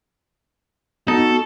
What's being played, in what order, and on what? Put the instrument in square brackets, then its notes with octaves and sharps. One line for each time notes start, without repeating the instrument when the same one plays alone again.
[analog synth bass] B3 [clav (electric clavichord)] D#4 [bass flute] F#4 [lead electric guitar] A4